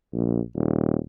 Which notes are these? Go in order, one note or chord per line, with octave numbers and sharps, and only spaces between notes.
A#1
D#1